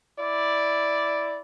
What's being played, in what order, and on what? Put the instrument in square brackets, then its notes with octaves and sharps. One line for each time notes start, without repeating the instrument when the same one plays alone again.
[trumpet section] E4 D5